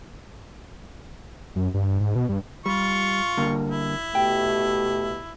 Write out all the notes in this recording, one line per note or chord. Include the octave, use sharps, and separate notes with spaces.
F#2
G2
G#2
B2
G2
G3 F4 C#6
D3 G3 A#3
E4
B2 A3 G4 G5